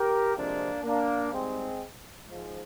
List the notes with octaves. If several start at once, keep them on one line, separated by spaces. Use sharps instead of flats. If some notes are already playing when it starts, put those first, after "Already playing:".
Already playing: G4 A#4
F2 C3 F3 G#3 A#3 D4
A#3 D4
G#2 G3 G#3 C4
G#2 F3 G#3